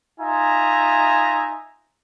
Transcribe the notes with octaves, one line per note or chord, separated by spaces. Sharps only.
D#4 F4 E5 G#5 A#5